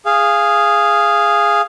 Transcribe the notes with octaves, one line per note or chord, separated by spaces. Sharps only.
G#4 F5